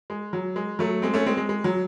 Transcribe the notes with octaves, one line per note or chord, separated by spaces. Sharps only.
G#3
F#3
G#3
F#3 A3
G#3 C4
A3 C#4
G#3 C4
G#3
G#3
F#3